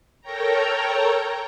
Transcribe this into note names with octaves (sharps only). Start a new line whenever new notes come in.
A4 A#4 C#5 G5 A#5